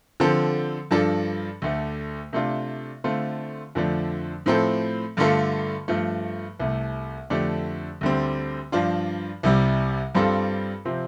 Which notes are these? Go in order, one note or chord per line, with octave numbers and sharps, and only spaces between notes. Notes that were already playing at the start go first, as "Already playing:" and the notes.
D3 F3 C4 A4
G2 F3 D4 A4
D2 D3 A3
C3 A3 D4 F4
D3 A3 C4 F4
F2 D3 F3 A3 D4
A2 F3 C4 A4
G2 D3 A3 F4 A4
G2 F3 A3
C2 C3 A3
F2 D3 A3 D4 G4
D2 D3 G3 C4
G2 F3 D4 F4
C2 C3 G3
G2 G3 C4 F4 A4
C3 F3 C4